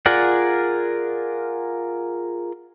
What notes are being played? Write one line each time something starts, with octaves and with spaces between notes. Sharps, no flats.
F4 G#4 A#4 D5 F#5